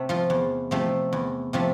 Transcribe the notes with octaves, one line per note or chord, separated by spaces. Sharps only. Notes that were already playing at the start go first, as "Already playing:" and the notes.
Already playing: C3 A3
F3 F4
E2
C3 F3 A3
E2
C3 F3 A3